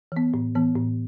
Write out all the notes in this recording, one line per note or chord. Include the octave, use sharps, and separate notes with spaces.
E3 B3
A2
E3 B3
A2